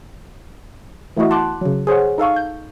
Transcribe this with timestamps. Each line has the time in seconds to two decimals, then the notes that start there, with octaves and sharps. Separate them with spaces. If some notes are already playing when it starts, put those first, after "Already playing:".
1.17 E3 A3 B3 E4 F#4 D#5
1.30 F#5 A5 C6 D6 F#6
1.61 C#3 F#3
1.87 G#4 C5 C#5 F#5
2.18 D#4 A4 F5 C#6
2.36 G6